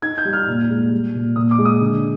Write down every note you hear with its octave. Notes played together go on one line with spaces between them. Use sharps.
D#4 G#6
G6
G3
F6
A#2
G#3
G3
A#2
A#2 D#6
D6
G#3
D#6
D3